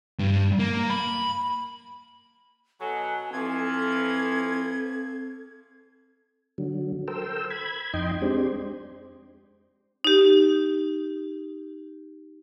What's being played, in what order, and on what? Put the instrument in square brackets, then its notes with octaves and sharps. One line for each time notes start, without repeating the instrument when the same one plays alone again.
[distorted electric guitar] G2
A#3
B5
[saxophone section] B2 F#3 [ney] A4 [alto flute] G#5
[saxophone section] E3 F3 [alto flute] C4 [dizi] G#6
[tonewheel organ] D3 F#3
A4 A#4 C5 G5 E6
B5 G#6
F2 D#4 D#5 G5 C6
G#3 C4 D4 G4 C5
[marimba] D#4 G4